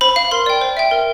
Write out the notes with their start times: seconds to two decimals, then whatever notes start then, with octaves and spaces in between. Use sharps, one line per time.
0.01 C5 B5
0.16 F5
0.31 A#4 C6
0.46 D5 G5
0.61 C5
0.77 E5 G5
0.91 A#4